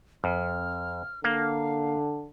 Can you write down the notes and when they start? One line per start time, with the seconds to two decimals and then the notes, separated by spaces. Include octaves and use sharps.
0.24 F2 F6
1.24 D3 A#3 F5